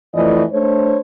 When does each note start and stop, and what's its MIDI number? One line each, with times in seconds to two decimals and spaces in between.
0.14 0.43 41
0.14 0.43 52
0.14 0.43 57
0.14 0.43 74
0.14 0.43 75
0.52 0.99 57
0.52 0.99 62
0.52 0.99 72
0.52 0.99 73